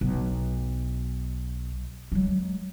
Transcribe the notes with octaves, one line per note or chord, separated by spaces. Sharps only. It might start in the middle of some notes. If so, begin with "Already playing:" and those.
B1
F#3 G#3